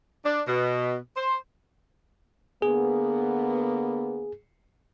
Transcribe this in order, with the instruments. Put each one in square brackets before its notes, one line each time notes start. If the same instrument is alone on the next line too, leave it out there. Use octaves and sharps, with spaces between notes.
[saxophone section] D4
B2
C5
[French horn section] D3 A#3 B3 [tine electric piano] G#4